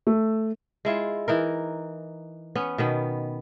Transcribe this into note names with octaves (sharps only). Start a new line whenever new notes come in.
A3
G#3 E4 F4
E3 D#4 A#4
B3 C#4
B2 D#3 B3